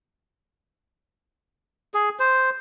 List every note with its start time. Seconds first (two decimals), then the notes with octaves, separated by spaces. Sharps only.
1.94 G#4
2.20 C5